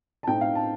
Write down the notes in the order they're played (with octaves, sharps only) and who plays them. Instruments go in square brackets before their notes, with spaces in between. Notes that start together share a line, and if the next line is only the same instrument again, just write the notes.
[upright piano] A5
A2 A3 C4 D#4 G5
F5
A5